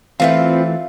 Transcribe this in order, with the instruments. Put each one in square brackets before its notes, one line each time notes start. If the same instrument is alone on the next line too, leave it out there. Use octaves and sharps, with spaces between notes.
[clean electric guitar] E3 A3 [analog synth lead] C4 [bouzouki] F4 B4 G5 [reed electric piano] E5 F5